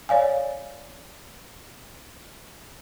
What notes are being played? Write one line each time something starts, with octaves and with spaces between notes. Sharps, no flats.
C#5 D5 F5 G#5